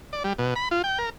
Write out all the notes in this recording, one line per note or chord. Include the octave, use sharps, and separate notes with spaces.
D5
G3
B2
B5
F4
G5
A#4